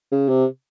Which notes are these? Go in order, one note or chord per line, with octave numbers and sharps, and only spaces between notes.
C#3
C3